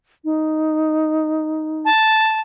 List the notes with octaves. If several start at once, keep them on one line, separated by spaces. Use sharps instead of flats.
D#4
A5